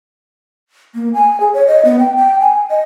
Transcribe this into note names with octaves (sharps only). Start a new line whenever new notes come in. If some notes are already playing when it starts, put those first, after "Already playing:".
A#3
G#5
G#4
C#5
D#5
B3
G5
G5
G#5
D#5